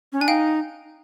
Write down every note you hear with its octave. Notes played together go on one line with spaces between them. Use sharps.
C#4
D4 G#5
D#4 F5 G5